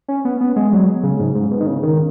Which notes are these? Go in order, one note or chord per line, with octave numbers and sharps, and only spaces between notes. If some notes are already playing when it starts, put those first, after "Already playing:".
C#4
B3
B3
G#3
F#3
C#3
G#2
G#2
B2
D#3
C#3
D#3